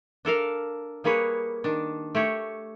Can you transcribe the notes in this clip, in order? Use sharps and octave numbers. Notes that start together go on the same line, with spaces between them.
D4 A4 A#4 F5
G3 A#3 G#4 B4 C#5
D#3 D4
A3 G4 C#5